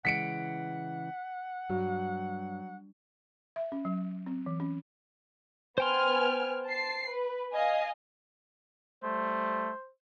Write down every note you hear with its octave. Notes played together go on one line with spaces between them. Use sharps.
C#3 E3 G#3 F#5 B6 C#7 D7
G2 F#3
E5
C#4
F#3
C4
E3
C#4
B3 C5 G5 G#5 C6 F6
A5 C7
B4
D#5 F5 G#5
G3 A3 C5